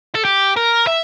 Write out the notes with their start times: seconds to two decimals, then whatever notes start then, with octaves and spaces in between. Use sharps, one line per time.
0.15 A4
0.25 G4
0.57 A#4
0.87 E5